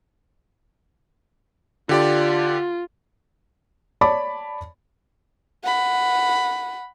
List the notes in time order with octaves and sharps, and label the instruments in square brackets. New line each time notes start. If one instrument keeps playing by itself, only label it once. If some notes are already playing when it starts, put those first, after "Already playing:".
[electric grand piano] D3 G4 D5 [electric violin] F4
[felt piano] C#5 D5 A5 B5 D6
[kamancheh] F#5 B5